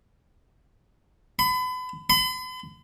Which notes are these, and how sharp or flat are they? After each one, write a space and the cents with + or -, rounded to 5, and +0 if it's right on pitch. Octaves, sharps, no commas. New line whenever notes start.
B5 +35
B5 +45